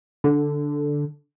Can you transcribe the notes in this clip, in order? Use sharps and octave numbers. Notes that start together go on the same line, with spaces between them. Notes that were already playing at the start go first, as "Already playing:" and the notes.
D3